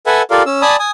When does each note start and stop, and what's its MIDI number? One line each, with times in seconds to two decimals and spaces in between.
0.06 0.22 69
0.06 0.22 71
0.06 0.22 76
0.06 0.22 78
0.06 0.22 80
0.31 0.43 65
0.31 0.43 67
0.31 0.43 69
0.31 0.43 70
0.31 0.43 74
0.31 0.43 77
0.46 0.62 61
0.46 0.62 88
0.62 0.76 74
0.62 0.76 80
0.62 0.76 81
0.62 0.76 83
0.62 0.76 87
0.79 0.91 80
0.79 0.91 87